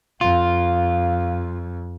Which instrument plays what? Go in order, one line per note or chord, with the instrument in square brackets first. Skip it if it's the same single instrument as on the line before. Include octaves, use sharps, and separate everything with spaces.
[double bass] F2 [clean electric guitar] F4 [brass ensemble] F5